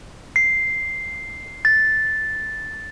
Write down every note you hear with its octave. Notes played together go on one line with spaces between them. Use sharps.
C7
A6